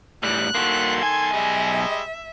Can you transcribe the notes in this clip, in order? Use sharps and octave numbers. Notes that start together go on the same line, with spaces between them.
A2 E3 G3 F#6
D#3 A#3 F#4 A4 C6
B1 G#5 G#6
G3 G#3 D#5 E5